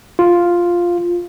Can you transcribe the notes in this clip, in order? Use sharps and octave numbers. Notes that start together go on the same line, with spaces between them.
F4